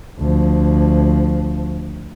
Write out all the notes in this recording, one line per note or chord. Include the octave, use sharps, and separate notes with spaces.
D2 F3